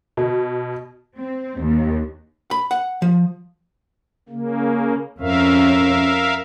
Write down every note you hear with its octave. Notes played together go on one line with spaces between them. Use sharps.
B2
C4
D#2
B5
F#5
F3
C#3 A#3
F2 C#4 A#4 E5 F5